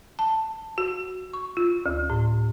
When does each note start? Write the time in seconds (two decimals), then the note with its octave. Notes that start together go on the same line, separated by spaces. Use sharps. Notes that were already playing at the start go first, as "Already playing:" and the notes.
0.19 A5
0.78 F#4
1.33 C#6
1.57 F4
1.86 D2
2.10 A2